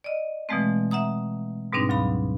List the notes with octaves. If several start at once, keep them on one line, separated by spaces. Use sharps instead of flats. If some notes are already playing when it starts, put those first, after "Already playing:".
D5 D#5
B2 E3 F3 G#3 A3 C4
E5 F#5 A#5 D#6
G#2 B2 G3 C4 D4 D#4
D2 F#3 F5 B5